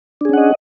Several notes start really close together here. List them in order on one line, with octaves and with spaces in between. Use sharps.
D4 G#4 C#4 F#5 D#5